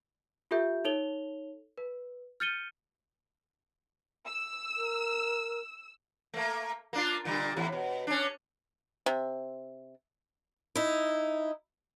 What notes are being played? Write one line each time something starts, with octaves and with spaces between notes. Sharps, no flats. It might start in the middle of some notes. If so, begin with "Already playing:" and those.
F4 G4 A4 E5 G6
D#4 A4 C#5 F7 G7
B4
F6 G6 A6 C#7 D#7 G7
E6
A#4
A3 A#3
A#3 D4 F4
A#2 D3 G3
E2 A2
B2
C#4 D4
C3
D#4 E4